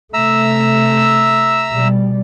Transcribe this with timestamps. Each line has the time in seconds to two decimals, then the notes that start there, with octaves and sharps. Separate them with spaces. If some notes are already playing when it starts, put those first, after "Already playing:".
0.14 C3 A3 E5 A#5 E6
1.72 B2 G3